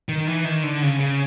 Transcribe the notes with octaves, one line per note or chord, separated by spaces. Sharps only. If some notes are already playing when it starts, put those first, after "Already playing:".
D#3
E3
D#3
D3
C#3
C#3